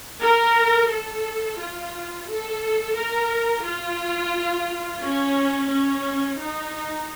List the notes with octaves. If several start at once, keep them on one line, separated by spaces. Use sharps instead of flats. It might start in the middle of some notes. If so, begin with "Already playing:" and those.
A#4
A4
F4
A4
A#4
F4
C#4
C#4
D#4